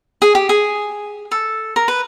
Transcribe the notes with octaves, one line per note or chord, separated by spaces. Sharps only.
G#4
G4
G#4
A4
A#4
B4